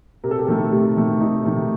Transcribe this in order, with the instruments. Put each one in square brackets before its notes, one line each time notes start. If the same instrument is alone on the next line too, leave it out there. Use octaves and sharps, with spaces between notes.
[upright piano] C3 A#4
A4
G4
D#3 A3 A4
C3
D#3 A3
C3 D#4
D#3 A3